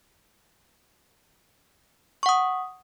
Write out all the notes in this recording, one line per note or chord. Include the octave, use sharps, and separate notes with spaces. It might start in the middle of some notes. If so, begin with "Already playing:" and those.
F#5 C#6 D#6